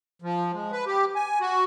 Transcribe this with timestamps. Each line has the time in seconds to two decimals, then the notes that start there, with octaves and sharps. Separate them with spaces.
0.22 F3
0.53 G#3
0.72 B4
0.86 G4
1.16 G#5
1.41 F#4